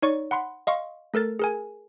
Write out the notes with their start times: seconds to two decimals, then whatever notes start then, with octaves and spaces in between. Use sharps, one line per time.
0.02 D#4 C#5 D5 C#6
0.31 F#5 B5 C6
0.67 D#5 F5 C6 C#6
1.14 A3 A4 A#4 A6
1.39 G#4 A#4 G#5